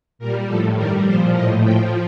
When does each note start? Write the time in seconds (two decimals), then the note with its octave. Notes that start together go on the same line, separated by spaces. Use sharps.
0.19 A#2 G3 A#4
0.47 A2 F3 A4
0.76 G2 D#3 G3 A#4
1.04 A#2 F3 C5
1.33 A2 F3 D#5
1.61 A2 G5
1.66 F3